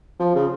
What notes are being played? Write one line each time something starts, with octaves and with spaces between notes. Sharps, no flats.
F3
C#3